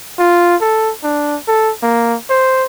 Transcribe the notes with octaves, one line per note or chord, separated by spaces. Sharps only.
F4
A4
D4
A4
A#3
C5